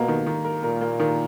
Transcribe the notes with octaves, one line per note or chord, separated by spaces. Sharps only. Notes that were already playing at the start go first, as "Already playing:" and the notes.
Already playing: B2 A#3
D#3
D#3
A#4
A#2 A#4
A#3
D#3